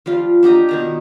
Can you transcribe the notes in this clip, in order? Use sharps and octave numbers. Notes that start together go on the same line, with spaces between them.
F3 G3 F4
D4 G4 D#5 A#5
B2 D#3 A#5